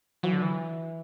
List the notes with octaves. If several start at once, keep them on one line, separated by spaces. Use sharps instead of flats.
E3 F#3
D3
E3